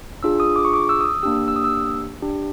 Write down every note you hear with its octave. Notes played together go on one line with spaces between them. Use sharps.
D4 F4 G#4 E6
D#6
D6
C#6
D6
E6
D#6
E6
A#3 D4 G4 E6
E6
D#6
E6
D4 G4